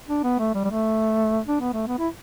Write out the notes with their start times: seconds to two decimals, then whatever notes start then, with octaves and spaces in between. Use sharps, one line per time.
0.09 D4
0.24 B3
0.39 A3
0.54 G3
0.65 G3
0.70 A3
1.47 D4
1.60 B3
1.73 A3
1.87 B3
1.98 E4